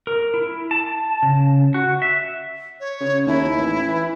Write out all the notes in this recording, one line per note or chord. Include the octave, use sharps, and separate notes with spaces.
A#4
E4
A5
C#3
F#4
E5
C#5
C#3
D#2 E4
A1
E3